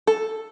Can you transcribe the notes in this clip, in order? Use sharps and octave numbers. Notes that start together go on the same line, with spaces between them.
A4